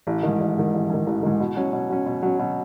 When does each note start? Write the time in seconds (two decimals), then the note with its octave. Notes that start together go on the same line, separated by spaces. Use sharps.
0.07 A1
0.23 D#3
0.28 G#2
0.40 A1
0.57 G#2 D#3
0.73 A1
0.90 G#2 D#3
1.06 A1
1.23 G#2 D#3
1.40 B2
1.56 F#3 C#4
1.73 B2
1.90 F#3 C#4
2.06 B2
2.22 F#3 C#4
2.39 B2